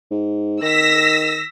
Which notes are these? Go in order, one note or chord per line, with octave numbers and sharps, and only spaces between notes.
G#2
D#3 E6 A#6 B6